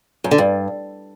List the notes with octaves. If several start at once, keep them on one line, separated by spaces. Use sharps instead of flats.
F#2
D3
G2